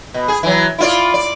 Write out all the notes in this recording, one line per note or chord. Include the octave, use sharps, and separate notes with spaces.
B2
G#4
E3 F#3
E4 F4 D5
D5